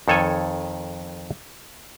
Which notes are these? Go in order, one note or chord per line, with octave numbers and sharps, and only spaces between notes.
F2 D#3 A4 C#5 G#5 A5